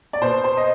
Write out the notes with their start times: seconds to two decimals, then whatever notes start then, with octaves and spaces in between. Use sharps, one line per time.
0.13 D5
0.21 B2 C5
0.44 C5
0.57 D#5